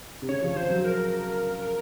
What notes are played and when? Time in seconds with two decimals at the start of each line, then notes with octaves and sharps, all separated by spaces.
0.22 C3
0.28 C#3 C#5
0.43 F3
0.56 F3 C5
0.70 F#3
0.85 A#4